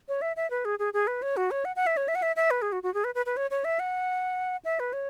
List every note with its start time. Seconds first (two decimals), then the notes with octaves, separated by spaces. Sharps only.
0.08 C#5
0.22 E5
0.36 E5
0.50 B4
0.65 G#4
0.79 G#4
0.94 G#4
1.07 B4
1.22 C#5
1.37 F#4
1.51 C#5
1.65 F#5
1.76 F#5
1.87 E5
1.97 C#5
2.08 E5
2.15 F#5
2.22 E5
2.36 E5
2.51 B4
2.62 G#4
2.72 F#4
2.83 F#4
2.94 G#4
3.04 B4
3.15 B4
3.26 B4
3.37 C#5
3.51 C#5
3.65 E5
3.80 F#5
4.65 E5
4.80 B4
4.93 C#5